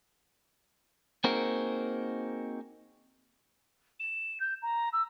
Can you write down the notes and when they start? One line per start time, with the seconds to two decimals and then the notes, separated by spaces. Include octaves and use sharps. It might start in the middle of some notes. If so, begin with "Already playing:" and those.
1.24 A#3 C4 D#4 F#4 G#4 A#4
4.00 E7
4.40 G6
4.62 A#5
4.93 E6